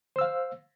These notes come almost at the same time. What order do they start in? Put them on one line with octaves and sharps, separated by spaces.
C5 E6 F5